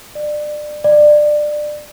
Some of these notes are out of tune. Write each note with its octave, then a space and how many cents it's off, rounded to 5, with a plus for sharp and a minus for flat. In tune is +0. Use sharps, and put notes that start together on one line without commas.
D5 +25
D5 +20